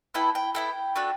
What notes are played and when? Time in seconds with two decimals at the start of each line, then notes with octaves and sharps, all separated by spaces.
0.14 B3 E4 A4 G5
0.35 G5
0.55 B3 E4 A4 G5
0.96 A3 D4 F#4 A4